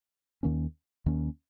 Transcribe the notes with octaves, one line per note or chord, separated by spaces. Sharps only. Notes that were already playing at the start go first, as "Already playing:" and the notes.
D#2 D#3 A#3 C#4
D#2 D#3 A#3 C#4